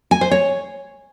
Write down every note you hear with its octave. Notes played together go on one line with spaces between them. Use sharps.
G#5
C5
C#5